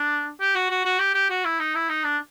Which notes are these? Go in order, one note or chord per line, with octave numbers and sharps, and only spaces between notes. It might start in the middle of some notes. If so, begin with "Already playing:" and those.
Already playing: D4
G4
F#4
F#4
F#4
G4
G4
F#4
E4
D#4
E4
D#4
D4